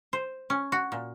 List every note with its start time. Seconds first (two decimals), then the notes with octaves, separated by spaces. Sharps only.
0.13 C5
0.50 C#4
0.72 F#4
0.92 A#2